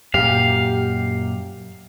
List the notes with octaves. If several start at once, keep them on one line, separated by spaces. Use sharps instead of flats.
F#2 A#2 G4 F5